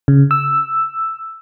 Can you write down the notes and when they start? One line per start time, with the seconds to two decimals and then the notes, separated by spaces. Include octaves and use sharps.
0.08 C#3
0.31 E6